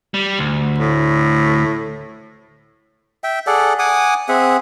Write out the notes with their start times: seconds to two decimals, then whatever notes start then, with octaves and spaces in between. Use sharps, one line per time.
0.14 G3
0.38 D2
0.78 A2
3.24 E5 G5
3.47 G#4 A4 D5 F#5
3.79 F#5 G#5 D6 D#6
4.28 C4 G#4 E5 F#5